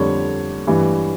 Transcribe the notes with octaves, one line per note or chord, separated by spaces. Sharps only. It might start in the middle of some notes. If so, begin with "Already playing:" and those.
Already playing: F2 D3 G3 C#5
G2 E3 G3